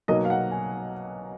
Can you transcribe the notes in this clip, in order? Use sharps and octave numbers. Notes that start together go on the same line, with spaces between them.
B1 B2 F#3 A#3 D#5
F5
F#5
G#5